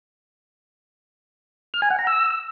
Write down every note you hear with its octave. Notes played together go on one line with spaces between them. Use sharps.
F6
G#5
F#5
A#5
E6